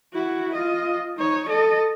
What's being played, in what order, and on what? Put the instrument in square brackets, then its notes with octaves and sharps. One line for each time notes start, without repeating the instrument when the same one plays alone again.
[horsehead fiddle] E4 F#4
F4 D#5
D#4 C#5
A4 D#5